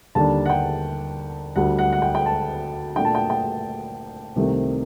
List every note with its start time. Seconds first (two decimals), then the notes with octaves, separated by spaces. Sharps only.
0.15 D#2 D3 G3 D4 A5
0.46 F#5
0.50 G5
1.56 D2 D3 G3 F#5
1.79 F#5
1.93 F#5
2.02 G5
2.15 G5
2.26 A5
2.95 A#2 A3 D4 G5
3.05 A5
3.15 G5
3.30 G5
4.36 C2 C3 D#3 A3 C4